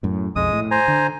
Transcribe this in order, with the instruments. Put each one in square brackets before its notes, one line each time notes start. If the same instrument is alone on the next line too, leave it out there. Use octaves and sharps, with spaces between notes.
[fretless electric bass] F#2 A2
[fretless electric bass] B1 F2 [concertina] G#3 D#6
[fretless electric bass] A2
[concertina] C5 G#5 A#5
[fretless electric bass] D3